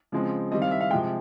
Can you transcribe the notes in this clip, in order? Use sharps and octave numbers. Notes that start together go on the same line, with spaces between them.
C#3 F3 G#3 C4
D#3 G3 C4 D#5
F5
E5
F5
C3 F3 G#3 G5